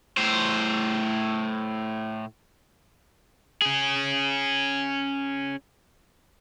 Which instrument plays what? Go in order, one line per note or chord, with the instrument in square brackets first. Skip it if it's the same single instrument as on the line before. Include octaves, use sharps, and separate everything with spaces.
[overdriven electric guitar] A2 C5
C#4 G#4